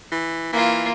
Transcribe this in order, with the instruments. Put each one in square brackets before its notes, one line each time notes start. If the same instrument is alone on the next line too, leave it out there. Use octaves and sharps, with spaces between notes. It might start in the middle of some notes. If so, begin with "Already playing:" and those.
[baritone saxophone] E3
[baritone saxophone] E3 [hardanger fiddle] A#3 F4